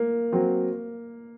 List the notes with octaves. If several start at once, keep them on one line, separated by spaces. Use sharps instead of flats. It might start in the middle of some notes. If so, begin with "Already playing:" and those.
Already playing: A#3
F#3 C4